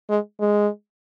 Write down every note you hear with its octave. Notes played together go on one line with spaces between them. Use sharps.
G#3
G#3